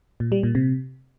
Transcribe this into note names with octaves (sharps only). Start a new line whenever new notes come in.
A#2
G3
A#2
C3